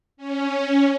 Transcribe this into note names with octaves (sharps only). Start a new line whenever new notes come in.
C#4